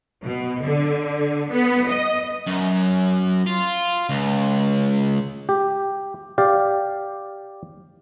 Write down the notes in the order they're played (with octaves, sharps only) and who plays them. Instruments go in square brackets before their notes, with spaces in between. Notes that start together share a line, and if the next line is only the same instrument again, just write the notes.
[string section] B2
D3
B3
D#5
[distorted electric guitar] F#2
F4
C#2
[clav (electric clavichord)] G4
G4 D5 F5